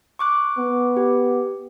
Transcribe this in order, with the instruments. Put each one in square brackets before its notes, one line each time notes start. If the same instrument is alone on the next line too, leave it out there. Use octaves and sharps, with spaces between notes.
[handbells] C#6 D6 F#6
[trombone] B3
[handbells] G4